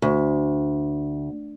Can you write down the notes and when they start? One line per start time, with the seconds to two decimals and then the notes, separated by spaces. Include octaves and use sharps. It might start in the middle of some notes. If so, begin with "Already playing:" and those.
0.02 D2